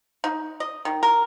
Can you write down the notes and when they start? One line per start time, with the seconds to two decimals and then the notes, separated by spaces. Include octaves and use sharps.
0.24 D#4
0.60 D#5
0.85 D#3
1.03 A#4